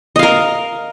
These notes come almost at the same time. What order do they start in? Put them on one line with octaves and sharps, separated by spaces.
D#5 F5 A#4